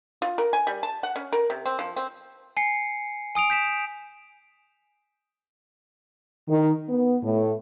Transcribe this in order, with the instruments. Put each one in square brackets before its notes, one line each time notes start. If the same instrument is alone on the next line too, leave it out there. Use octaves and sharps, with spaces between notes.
[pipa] F4
A#4
G#5
G3
A5
F#5
C#4
A#4
C3
C4
F3
C4
[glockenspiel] G#5 C7 C#7
G#5 D#6 D7 F7
G6 B6 E7
[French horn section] D#3
B3
A2